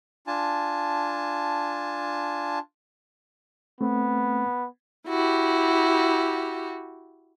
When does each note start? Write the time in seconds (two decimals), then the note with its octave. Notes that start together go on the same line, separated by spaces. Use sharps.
0.27 D4 F4 G#5 A5
3.81 A3 B3 C4
5.07 E4 F#4 G4